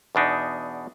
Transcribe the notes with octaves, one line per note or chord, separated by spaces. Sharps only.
E2 B2 D4 D#4